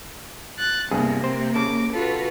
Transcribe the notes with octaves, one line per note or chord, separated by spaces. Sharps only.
F#6 A6
C2 G2 C3 A#3 B3 G#4
C4 C5
C#3 A5 D6
F4 F#4 A4 B4